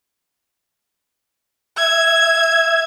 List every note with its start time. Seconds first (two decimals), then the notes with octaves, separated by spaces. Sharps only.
1.77 E5 E6 G#6